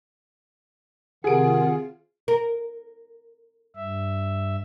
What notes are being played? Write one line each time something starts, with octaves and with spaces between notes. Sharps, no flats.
C3 D#3 F4 G4 G#4 A#4 F#5 D7
A#4
G2 E5